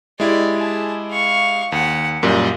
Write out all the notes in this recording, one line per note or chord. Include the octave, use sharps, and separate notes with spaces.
G#3 E4 G4 D5
G#4 A5
F5 C#6
D#2 F#5
F#2 A#2 G3 D#5